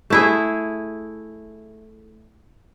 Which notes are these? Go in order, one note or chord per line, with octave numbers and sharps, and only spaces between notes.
A3 E4 G#4